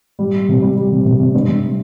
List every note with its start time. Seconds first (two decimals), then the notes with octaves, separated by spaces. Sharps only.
0.19 G3
0.33 G3
0.49 C3
0.62 G3
0.76 G3
0.92 C3
1.05 C3
1.19 C3
1.35 G2
1.49 G2